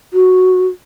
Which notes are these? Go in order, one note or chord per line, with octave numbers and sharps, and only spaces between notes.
F#4